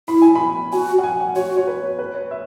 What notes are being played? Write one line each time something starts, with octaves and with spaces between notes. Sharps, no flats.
E4 B5
G#5
B5
F#4 G#5
F#5
G#5
F#5
F#4 C#5
C#5
B4
C#5
B4
C#5
E5